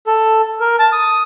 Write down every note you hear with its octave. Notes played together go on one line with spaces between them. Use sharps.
A4
A#4
A5
D#6